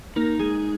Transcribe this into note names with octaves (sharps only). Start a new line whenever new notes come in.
A#3 D#4 A#4
G#3 G#4